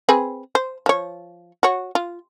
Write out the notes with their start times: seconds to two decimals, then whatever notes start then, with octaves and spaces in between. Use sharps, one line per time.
0.09 C4 G#4 B4
0.55 C5
0.86 F3 C#5
1.63 F#4 C#5
1.95 F4